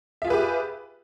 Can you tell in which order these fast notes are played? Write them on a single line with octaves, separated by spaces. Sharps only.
E5 F4 G#4 B4 G4